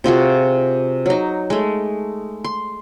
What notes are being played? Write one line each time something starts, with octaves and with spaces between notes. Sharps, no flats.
C3 F4 F#4 G#4
F#3 D#4
G#3 A3
C6